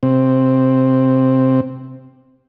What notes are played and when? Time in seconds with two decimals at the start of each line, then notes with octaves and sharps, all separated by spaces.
0.03 C3 C4